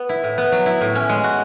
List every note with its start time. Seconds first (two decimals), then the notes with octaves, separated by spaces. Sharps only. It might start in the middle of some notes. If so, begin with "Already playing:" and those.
Already playing: B3
0.09 E4
0.23 A2
0.38 B3
0.52 F#3
0.66 E4
0.81 A2
0.95 C#4
1.09 G#3
1.24 F#4